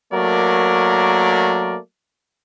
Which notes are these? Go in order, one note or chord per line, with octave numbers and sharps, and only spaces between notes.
F#3 A3 A#3 A#4 D5